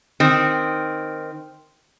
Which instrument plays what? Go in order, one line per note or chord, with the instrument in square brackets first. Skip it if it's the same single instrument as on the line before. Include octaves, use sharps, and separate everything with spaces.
[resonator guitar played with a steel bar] D#3 C4